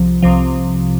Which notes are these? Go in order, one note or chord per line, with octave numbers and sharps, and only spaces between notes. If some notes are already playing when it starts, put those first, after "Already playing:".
Already playing: C2 C3 F3
C2 C3 F3